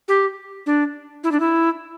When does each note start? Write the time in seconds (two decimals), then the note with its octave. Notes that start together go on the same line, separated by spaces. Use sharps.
0.08 G4
0.66 D4
1.24 E4
1.32 D4
1.40 E4